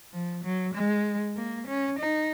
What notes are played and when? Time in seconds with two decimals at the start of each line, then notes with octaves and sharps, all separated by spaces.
0.13 F3
0.44 F#3
0.74 G#3
1.36 A#3
1.67 C#4
1.99 D#4